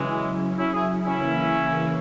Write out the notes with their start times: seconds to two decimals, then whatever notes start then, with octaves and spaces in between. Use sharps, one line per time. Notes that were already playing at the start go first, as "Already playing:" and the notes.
Already playing: C#3 E3 F#3 G#3 C#4 E4
0.58 C#4 E4
0.74 E4 G#4
1.05 C#3 E3 A#3 C#4 E4